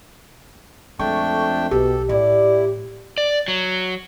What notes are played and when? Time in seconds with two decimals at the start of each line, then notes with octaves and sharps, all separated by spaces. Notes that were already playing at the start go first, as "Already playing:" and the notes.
0.99 F2 G#3 A3 D4 G5 C#6
1.71 B1 B2 G4 A4
2.09 A2 E4 D5
3.18 D5
3.48 F#3